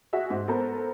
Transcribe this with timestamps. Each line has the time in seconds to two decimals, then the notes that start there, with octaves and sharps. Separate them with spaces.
0.13 F#4 G#4 E5 F#5
0.30 G#2
0.48 B3 A4 A#4 C5